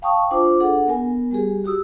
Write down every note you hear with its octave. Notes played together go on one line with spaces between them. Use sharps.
F5 G5 A5 C#6 D#6
D4 F4 C5 D6
D4 G#4 A4 F#5
B3 A#4 G#5
G3 G4 G#4
F#4 G4 D#6 E6